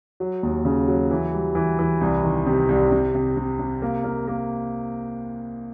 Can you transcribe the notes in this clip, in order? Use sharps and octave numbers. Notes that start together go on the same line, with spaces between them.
F#3
D#2
C#3
F#3
E3
G3
E3
E3
C2
D#3
C3
C2
C3
C3
C3
C3
A#3
A#3
A#3